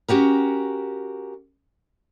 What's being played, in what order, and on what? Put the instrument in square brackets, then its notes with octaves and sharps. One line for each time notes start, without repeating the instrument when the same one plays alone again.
[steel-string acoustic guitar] C#4 F#4 G4 A#4